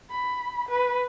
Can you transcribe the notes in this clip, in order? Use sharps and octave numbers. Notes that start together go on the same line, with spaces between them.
B5
B4